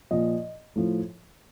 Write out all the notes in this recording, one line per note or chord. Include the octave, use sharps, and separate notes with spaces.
A#2 F3 D#5
A2 F3